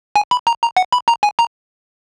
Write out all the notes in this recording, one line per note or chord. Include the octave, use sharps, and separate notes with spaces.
G#5
B5
A#5
A#5
F#5
B5
A#5
G#5
A#5